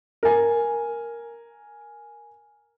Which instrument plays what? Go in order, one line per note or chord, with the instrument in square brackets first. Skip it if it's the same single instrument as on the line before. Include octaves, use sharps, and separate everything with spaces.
[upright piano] A#4 G#5